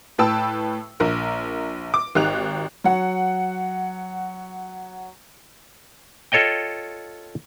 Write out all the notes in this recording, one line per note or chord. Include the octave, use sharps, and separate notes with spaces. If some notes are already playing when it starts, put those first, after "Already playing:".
A2 B4 G5 A5 E6
A#1 A#4
D6
G#1 D#4 G4 F#6 F7
F#3 F#5
F4 A4 C#5 D#5 G5